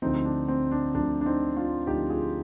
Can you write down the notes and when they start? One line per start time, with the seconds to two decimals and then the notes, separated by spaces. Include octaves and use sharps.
0.02 D2 D3 F3 C4 D#4
0.25 D4
0.48 C4
0.71 D4
0.94 D2 D3 F3 D4
1.21 D4
1.26 C4 D#4
1.56 D4 F4
1.87 D2 D3 F3 D#4 G4
2.10 F4 G#4